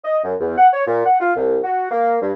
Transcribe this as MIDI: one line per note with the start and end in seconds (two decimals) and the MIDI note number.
0.05 0.18 75
0.24 0.34 42
0.40 0.54 40
0.58 0.68 78
0.74 0.83 73
0.87 1.05 46
1.06 1.17 78
1.21 1.32 65
1.36 1.58 36
1.64 1.88 66
1.91 2.17 58
2.21 2.32 43